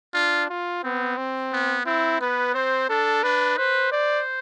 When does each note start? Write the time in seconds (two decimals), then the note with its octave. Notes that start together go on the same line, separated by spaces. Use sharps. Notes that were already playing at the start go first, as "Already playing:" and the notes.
0.14 D4 F4
0.50 F4
0.83 B3 C4
1.17 C4
1.53 B3
1.86 C4 E4
2.21 B3 B4
2.54 C4 C5
2.89 D4 A4
3.23 D4 B4
3.57 B4 C5
3.92 C5 D5